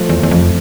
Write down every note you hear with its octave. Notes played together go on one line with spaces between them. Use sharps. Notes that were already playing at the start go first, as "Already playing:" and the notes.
Already playing: F3 A3
E2
E2
F2